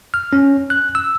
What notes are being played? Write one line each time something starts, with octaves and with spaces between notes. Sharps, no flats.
F6
C#4
F#6
E6